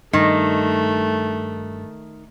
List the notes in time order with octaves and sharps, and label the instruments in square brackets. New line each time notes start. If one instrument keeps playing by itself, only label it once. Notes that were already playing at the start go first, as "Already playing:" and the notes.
[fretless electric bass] G2 [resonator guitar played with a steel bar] D#3 [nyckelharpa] A3